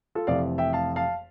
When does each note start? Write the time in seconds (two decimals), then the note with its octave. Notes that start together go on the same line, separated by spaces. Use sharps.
0.15 F4 A4
0.27 F1 F2 E3 A3 D5 F5
0.58 E5 G5
0.73 F5 A5
0.96 F5 A5